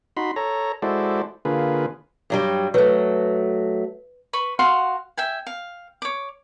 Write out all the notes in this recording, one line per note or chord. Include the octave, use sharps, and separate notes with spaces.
D#4 F#4 B5 C6
A4 C#5 A#5
G#3 E4 F#4 A4 C5 D5
D3 A#3 F4 G#4 B4
G2 F#3 G3
F#3 A3 B4 C#5
B4 B5 C#6
F#4 F5 F#5 C6
E5 G5 G#5
F5
C#5 D6